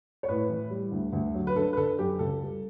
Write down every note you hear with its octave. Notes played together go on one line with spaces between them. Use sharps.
C#5
A2 B4
E3
G3
D2
D2
F#3
B4
D3 A4
B4
D3 A4
F#2 G4
C#2 A4
G3